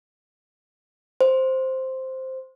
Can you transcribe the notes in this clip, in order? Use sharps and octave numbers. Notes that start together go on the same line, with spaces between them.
C5